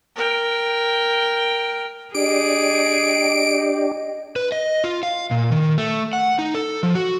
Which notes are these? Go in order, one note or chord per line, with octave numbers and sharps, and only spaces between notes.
A#4 G5
D4 G4 G#4 D#5 D7
B4
D#5
F4
F5
A#2
D#3
A3
F#5
D#4
A4
F3
F#4